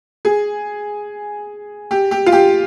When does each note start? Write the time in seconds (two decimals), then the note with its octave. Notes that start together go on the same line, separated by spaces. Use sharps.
0.25 G#4
1.91 G4
2.11 G4
2.26 F4
2.32 G4